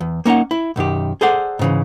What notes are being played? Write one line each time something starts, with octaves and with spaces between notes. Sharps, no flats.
E2
A#3 C#4 D#4 C#5 F#5
E4
B1 F#2 D#3 G4
G#4 A4 C5 D5 F#5
G#2 C#3 E3